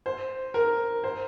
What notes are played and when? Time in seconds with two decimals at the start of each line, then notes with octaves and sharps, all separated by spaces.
0.06 C5
0.54 A#4
1.04 C5